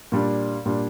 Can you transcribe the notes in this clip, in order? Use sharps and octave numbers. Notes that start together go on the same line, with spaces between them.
A#2 G3 D4
A#2 G3 D4